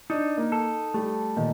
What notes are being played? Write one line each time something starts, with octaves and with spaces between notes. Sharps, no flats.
D4 D#4
A#3
A4
G3 A3
A#2 D#3